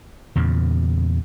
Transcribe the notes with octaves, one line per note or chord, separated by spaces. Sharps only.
E2 A#2 C#3